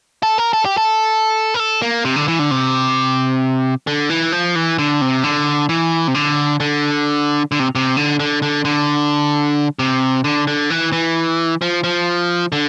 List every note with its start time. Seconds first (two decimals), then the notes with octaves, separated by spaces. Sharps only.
0.23 A4
0.38 A#4
0.53 A4
0.65 G4
0.77 A4
1.54 A#4
1.60 A4
1.82 A#3
2.05 C3
2.16 D3
2.28 E3
2.39 D3
2.51 C3
3.87 D3
4.10 E3
4.32 F3
4.55 E3
4.78 D3
5.01 C3
5.24 D3
5.69 E3
6.07 C3
6.15 D3
6.60 D3
7.52 D3
7.59 C3
7.75 C3
7.97 D3
8.20 D3
8.42 D3
8.65 D3
9.79 C3
10.24 D3
10.47 D3
10.70 E3
10.92 E3
11.62 F3
11.84 F3
12.52 D3